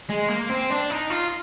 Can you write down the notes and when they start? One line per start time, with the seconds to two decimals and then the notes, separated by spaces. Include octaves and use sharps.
0.10 G#3
0.30 A#3
0.50 C4
0.70 D4
0.90 D#4
1.10 F4